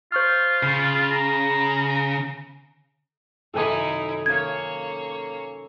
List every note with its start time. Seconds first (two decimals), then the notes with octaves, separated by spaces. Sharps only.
0.12 F4 C5 C#6 F6
0.63 C#3 C7
1.11 A#5
3.54 F#2 C3 D#3 D#4 E4 A4 G#5 D#6
4.26 A#3 C#4 C#5 F5 G#6